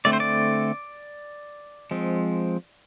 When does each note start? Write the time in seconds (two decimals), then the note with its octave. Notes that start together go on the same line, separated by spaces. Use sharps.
0.05 D3 A3 C4 D5
0.13 C5
0.20 D5
1.91 F3 G#3 C4